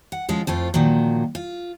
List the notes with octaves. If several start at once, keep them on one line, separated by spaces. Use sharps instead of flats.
F#5
F3 G#3 C#4
F2 A3 F4 C5
A#2 D#3 F3 F#3
F4